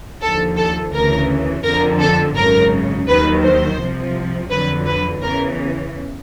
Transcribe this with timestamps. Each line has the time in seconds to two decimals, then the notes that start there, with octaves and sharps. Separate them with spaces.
0.21 D#2 D3 F3 A4
0.57 A4
0.93 D2 C#3 E3 A#4
1.64 F2 D3 F3 A#4
2.00 A4
2.36 G#1 F#2 C#3 A#4
3.07 D#2 D#3 F#3 B4
3.43 C5
3.79 C2 C3 F3
4.50 F2 D3 F#3 B4
4.86 B4
5.22 E2 C#3 E3 A#4